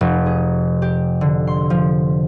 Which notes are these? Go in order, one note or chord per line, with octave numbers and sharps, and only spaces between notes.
F1
G#4
G4
D3
C6
F3